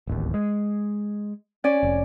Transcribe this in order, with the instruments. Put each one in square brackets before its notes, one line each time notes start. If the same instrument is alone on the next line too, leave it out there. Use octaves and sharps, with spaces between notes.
[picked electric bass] D1 A1 D#2
G#3
[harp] C#4 D5 G#5
[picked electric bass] F1